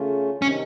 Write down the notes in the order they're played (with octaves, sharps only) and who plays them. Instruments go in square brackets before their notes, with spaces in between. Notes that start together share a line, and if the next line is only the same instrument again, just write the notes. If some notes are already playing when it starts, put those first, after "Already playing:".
Already playing: [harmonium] C#3 A3 C#4 F4
[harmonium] C3 D#3 [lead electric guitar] C#4